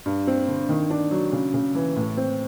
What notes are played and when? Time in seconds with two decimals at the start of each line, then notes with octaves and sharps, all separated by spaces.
0.06 G2
0.27 C4
0.48 D3
0.69 D#3
0.90 D4
1.11 F#3
1.32 C#3
1.54 C#3
1.75 E3
1.96 A2
2.17 C4